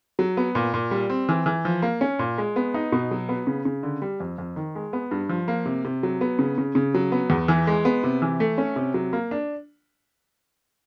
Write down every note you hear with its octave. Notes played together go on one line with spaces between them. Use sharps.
F#3
B3
A#2
A#2
G3
C4
E3
E3
F3
A#3
C#4
A#2
G#3
B3
D#4
B2
F#3
B3
C#3
C#3
D3
G3
F2
F2
D#3
G#3
B3
G2
F3
A#3
C3
C3
F#3
B3
C#3
C#3
C#3
F#3
B3
E2
E3
G#3
B3
C3
E3
A3
C#4
C3
F#3
A#3
D4